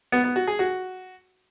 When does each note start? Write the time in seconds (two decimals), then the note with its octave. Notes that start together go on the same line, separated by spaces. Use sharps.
0.12 B3
0.24 B3
0.36 F#4
0.47 G#4
0.59 F#4